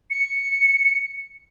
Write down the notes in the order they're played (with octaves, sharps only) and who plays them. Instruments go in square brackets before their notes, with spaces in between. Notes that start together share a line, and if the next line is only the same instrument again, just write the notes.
[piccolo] C#7